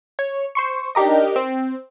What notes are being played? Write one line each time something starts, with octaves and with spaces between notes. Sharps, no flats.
C#5
C5 C6 C#6
D4 D#4 G4 A#4 D#5
C4